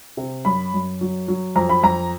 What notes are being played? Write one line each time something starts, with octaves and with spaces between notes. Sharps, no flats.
C3
F#2 B5
F#2
F#3
F#3
F2 A#5
B5
F2 A#5